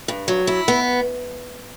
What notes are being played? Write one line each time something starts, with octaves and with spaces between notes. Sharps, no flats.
G2
F#3
E4
B3